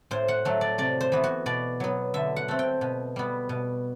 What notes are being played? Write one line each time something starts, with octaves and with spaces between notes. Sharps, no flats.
A2 C5
F#5
F#3 A3
D5
C3 D5
C5
E3 B3
F#4
B2 D5
F#3 B3
D3 E5
F#5
A3 C4
G5
B2
G3 B3
B2